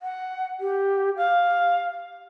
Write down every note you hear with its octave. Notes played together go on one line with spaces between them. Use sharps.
F#5
G4
F5